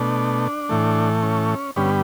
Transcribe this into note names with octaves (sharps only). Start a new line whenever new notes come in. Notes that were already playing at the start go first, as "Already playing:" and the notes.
Already playing: B2 A3 D4
A2 E3 A3
C#4
G2 D3 G3 B3 C#4